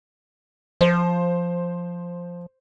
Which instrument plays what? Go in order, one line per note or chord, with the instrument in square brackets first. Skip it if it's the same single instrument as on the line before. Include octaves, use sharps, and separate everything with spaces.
[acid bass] F3 [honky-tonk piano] C5